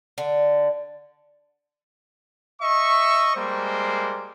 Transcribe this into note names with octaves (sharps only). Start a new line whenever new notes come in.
D3
D#5 E5 C#6
G3 G#3 A#3 C5